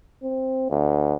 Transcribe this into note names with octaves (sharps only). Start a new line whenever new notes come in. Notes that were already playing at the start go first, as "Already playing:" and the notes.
C4
D2